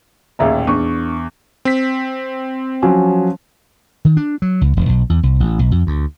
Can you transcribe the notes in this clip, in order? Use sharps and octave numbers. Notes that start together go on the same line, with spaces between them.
A1 D#2 A#2 G#4 E5 A#5
E2 D4 C#6
C4 B6
F3 F#3 C#4
D#3
D4
F#3
C#2
E1
B1
E2
C2
A1
B1
F2
D2